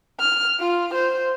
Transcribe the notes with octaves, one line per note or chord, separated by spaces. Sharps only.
F6
F4
C5